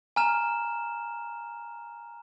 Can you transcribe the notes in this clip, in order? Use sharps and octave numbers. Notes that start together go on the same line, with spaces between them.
G#5 A#5 F6 E7